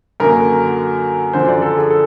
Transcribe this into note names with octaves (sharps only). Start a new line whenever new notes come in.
F#2 D3 F#3 A#3 A#4
F#2 D3 F3 C5
D5
A4
G#4
A4